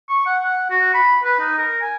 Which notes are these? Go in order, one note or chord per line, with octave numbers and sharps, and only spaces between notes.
C#6
F#5
F#5
F#4
B5
B4
D#4
A#4
G#5